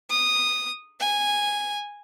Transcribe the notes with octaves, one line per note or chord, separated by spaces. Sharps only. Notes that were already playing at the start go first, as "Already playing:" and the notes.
D#6
G#5